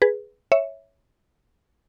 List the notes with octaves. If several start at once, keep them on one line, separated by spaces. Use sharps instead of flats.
G#4 B4
C#5 E5